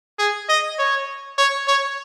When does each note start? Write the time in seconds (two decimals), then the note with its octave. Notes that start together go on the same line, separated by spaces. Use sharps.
0.19 G#4
0.49 D#5
0.79 C#5
1.38 C#5
1.67 C#5